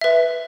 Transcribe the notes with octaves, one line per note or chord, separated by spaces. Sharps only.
B4 E5